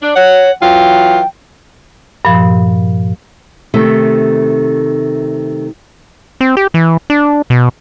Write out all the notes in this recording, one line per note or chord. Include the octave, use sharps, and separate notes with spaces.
D4
C#5 F#5
E3 F#3 F4 G5
G2 A#2 F3
C3 D#3 A3
C4
G4
E3
D4
B2